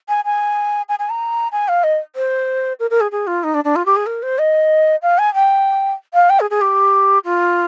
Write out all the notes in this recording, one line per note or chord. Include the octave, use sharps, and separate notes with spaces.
G#5
G#5
G#5
G#5
A#5
G#5
F5
D#5
C5
A#4
A#4
G#4
G#4
F4
D#4
D4
D4
F4
G4
G#4
A#4
C5
D#5
F5
G#5
G5
F5
G5
G#4
G#4
G4
F4